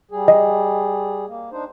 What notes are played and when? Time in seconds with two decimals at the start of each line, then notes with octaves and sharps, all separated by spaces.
0.11 G3 G#4
0.28 D#5
1.28 A#3
1.52 D4 D#4 C5